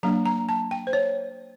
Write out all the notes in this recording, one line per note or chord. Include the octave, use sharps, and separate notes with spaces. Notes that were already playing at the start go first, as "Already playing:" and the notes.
F#3 A#3 D4 A#5
A#5
A5
G5
C5
C#5